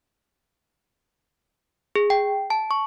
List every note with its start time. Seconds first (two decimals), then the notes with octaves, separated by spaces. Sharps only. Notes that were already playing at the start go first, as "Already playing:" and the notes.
1.96 G#4
2.10 G5
2.50 A5
2.71 C#6